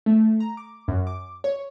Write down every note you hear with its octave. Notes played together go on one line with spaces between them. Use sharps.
A3
A#5
D6
F#2
D6
C#5